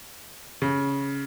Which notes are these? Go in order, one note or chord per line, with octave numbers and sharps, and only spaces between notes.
C#3